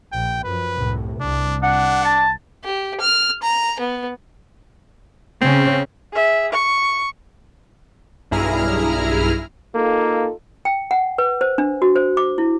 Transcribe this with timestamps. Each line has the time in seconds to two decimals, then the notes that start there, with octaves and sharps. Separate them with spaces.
0.12 A#1 G5
0.44 F#2 F3 B4
0.76 C2 A2 C3
1.20 C2 D4
1.63 D4 F#5
2.05 A5
2.64 G4
3.00 F6
3.42 A#5
3.79 B3
5.41 C#3 C4 C#4
6.13 G#4 E5
6.52 C#6
8.31 B1 G2 E4 G#4 A#5 F6
9.75 A#3 D#4 F4 A4
10.65 G5
10.91 F#5
11.18 B4
11.41 C5
11.58 D4
11.82 F#4
11.96 C5
12.17 D6
12.38 E4